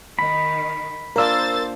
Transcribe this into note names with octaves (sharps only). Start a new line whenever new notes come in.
D#3 B5
A#3 D4 F4 A#4 C5 E6 A6